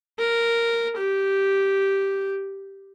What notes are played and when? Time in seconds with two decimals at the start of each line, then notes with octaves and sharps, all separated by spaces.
0.19 A#4
0.97 G4